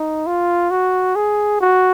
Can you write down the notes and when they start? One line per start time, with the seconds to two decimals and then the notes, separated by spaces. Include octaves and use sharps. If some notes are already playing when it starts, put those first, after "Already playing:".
Already playing: D#4
0.26 F4
0.71 F#4
1.16 G#4
1.61 F#4